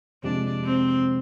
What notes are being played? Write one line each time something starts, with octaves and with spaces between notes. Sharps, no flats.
F2 C3 F3 G#3 D4
C4